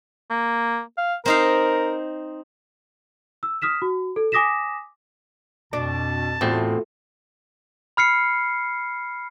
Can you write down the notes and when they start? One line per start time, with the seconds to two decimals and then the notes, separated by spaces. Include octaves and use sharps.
0.30 A#3
0.98 F5
1.26 C4 D#4 A#4 F5
3.43 E6
3.62 D#6 F6 B6 E7
3.82 F#4
4.16 A4
4.32 G#5 D6 D#6 A#6 B6 E7
5.73 F2 B2 D4 A5
6.41 E2 A2 C4 F4 F#4
7.97 B5 F6 C7 C#7